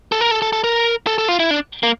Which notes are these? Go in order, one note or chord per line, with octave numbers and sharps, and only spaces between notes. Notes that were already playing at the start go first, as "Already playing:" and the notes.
A4
A#4
A4
A4
A4
A#4
A4
A4
F4
E4
D4
A#3